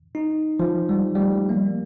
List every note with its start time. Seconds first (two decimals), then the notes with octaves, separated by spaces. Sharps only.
0.15 D#4
0.59 F3
0.89 G3
1.15 G3
1.20 A3
1.49 A#3